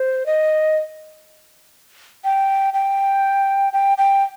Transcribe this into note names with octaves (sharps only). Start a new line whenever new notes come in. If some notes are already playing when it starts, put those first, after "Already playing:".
Already playing: C5
D#5
G5
G5
G5
G5